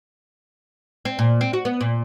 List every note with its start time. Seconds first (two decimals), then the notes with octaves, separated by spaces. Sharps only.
1.05 C4
1.19 A#2
1.41 C4
1.53 F#4
1.65 B3
1.81 A#2